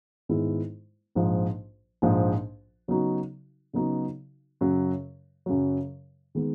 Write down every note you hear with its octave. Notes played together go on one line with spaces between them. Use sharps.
G#2 D#3 G#3 B3 E4
A#1 G#2 F3
A#1 G#2 F3
C#3 F#3 B3 D#4 F#4
C#3 F#3 B3 D#4 F#4
F#2 C#3 F#3
F#2 C#3 F#3
D#3 G#3 B3